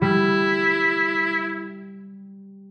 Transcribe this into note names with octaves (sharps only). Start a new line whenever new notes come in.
G3 E4